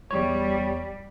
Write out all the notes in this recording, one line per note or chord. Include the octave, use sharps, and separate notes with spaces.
E2 G3 C#5